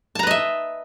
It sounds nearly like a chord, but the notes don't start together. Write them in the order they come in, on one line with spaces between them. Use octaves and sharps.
A5 A#5 B4 D#5 E5